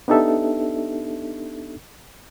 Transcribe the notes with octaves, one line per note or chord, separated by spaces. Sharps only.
B3 D4 D#4 G4 A4 E5